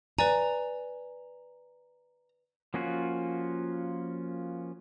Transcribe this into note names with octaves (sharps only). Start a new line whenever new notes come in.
B4 D5 G#5 A#5
F3 A#3 C#4 F4 F#4